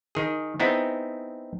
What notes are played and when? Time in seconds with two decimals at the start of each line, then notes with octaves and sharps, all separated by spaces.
0.15 D#3 G#4
0.60 B3 C4 D#4 E4 G#4